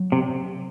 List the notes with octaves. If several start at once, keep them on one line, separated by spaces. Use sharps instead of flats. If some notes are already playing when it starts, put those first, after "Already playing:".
Already playing: F#3
C3